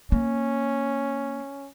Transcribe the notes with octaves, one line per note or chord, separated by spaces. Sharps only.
A#3 C#4